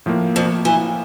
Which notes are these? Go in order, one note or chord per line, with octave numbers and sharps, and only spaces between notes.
A2 F3 A#3
F2
E3